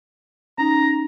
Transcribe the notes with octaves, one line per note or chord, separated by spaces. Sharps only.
C#4 D#4 A#5